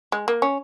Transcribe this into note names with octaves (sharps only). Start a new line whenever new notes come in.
G#3
A#3
C#4